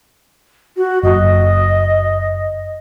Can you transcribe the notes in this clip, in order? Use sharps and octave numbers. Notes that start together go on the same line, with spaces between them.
F#4
F#1 D#5